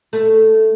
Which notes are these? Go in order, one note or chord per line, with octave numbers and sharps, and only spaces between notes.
A3